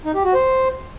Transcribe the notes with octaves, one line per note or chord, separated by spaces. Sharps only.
D#4
G4
F#4
C5